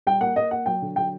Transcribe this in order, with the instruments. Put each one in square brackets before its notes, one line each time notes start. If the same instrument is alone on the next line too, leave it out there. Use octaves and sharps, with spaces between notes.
[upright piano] G3 G5
A#3 F#5
A#3 D#5
A#3 F#5
F#3 G5
D3
F#3 G5